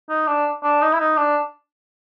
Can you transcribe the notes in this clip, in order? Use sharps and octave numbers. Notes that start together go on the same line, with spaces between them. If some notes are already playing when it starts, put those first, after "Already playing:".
D#4
D4
D4
D#4
E4
D#4
D4